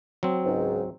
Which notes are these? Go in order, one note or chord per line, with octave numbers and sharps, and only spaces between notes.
F#3 C4
C#2 G#2